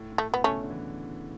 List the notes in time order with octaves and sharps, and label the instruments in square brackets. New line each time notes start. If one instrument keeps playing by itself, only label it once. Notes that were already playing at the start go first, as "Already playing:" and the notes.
Already playing: [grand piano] A2
A2
[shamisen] A3
[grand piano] B2 [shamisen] B3
[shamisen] A3 C#4
[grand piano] C#3
D3
E3